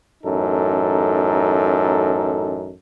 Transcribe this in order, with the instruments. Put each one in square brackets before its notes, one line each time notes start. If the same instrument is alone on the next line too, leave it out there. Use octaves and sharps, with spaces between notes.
[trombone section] A1 F#2 D#4 A4